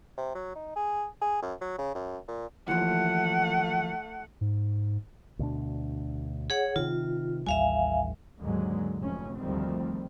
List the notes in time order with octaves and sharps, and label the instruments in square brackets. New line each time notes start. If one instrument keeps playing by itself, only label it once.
[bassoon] C3
F#3
D#4
G#4
G#4
F#2
F#3
C#3
F#2
A#2
[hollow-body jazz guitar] D#2 E3 F3 [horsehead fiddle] A3 F#5
[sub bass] G#2
[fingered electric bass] D2 B2 D4
[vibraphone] G#4 C#5 F#5
[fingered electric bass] C3 D#3 [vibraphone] F4
[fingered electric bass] A1 D#2 G3 [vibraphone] E5 F5 G#5
[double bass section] D#2 G#2 D3 F#3 G#3
F1 G#2 C#4
D2 D#3 F3 G3 A3 C4